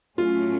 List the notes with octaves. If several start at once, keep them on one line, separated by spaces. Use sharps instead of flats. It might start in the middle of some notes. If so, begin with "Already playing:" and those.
A2 F#3 A3 C#4 F4